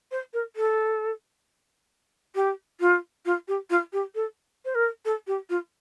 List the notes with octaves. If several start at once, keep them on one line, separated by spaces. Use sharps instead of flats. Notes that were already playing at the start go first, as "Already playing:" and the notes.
C5
A#4
A4
G4
F4
F4
G4
F4
G4
A4
C5
A#4
A4
G4
F4